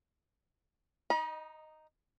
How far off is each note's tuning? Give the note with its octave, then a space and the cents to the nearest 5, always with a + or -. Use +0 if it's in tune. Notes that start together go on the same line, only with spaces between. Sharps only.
D#4 +0 D#5 -10 A#5 +45